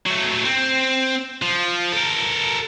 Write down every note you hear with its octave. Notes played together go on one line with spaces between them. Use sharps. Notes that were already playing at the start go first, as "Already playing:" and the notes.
F#3 A3
C4
F3
A4 A#4